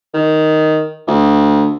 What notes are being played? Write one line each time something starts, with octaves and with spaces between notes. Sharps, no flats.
D#3
D2